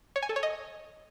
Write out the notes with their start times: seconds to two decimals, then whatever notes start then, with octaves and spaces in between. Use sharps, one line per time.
0.16 C#5
0.22 G#5
0.29 A4
0.36 C#5
0.43 D#5